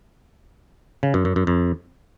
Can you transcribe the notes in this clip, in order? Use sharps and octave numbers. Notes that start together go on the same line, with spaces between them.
C#3
F#2
F#2
F#2
F2